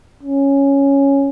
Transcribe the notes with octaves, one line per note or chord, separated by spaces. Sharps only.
C#4